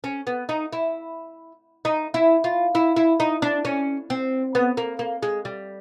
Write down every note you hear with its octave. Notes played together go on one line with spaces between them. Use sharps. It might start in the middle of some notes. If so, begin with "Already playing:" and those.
C#4
B3
D#4
E4
D#4
E4
F4
E4
E4
D#4
D4
C#4
C4
B3
A#3
A#3
G#3
G3